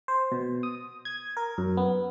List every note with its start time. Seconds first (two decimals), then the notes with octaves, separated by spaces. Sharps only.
0.08 C5
0.32 B2
0.63 D#6
1.05 G#6
1.37 A#4
1.58 F#2
1.77 B3